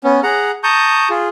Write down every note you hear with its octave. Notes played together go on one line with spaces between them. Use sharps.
B3 C#4
G#4 F#5 A#5
A5 A#5 C#6 D#6 G6
F4 G#4